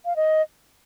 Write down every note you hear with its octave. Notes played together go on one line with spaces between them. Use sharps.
F5
D#5